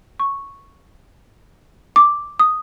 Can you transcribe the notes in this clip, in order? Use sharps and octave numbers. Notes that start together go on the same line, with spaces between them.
C#6
D6
D#6